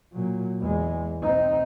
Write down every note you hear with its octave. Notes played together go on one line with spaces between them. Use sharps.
A#2 F#3
E2 G#3
C4 D#4